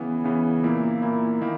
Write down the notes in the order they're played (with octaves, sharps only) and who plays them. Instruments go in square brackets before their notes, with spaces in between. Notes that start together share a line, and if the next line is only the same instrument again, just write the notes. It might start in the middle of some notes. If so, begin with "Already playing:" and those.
Already playing: [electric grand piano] C#3 E3 B3
C#3 E3 B3
A#2 A#3 E4
A#2 A#3 E4
D#3 A#3 E4